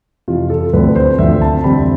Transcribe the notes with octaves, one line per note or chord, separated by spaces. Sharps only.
F2 C3 E3 F4
A4
D2 D3 F3 A3 C4 B4
C5
D2 D3 F3 A3 C4 E5
A5
F2 D3 G3 C4 B5